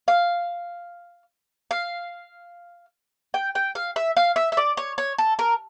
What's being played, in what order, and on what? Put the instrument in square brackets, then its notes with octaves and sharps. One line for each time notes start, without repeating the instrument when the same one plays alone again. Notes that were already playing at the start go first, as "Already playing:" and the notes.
[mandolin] F5
F5
G5
G5
F5
E5
F5
E5
E5
D5
C#5
C#5
A4
A#4